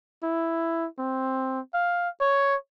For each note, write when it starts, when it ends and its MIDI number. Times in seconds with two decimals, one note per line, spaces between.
0.23 0.87 64
0.99 1.60 60
1.74 2.09 77
2.21 2.55 73